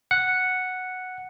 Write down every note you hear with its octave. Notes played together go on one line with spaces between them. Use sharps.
F#5 C#7